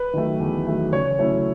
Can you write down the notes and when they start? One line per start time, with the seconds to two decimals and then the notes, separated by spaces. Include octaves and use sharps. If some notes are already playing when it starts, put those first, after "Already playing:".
Already playing: B4
0.14 D#3 F#3 A3
0.39 E2
0.66 D#3 F#3 A3
0.93 C#3 C#5
1.19 F#3 A3 C#4 E4 C#5